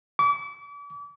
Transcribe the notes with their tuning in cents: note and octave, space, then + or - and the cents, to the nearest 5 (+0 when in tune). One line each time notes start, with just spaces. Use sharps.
D6 -40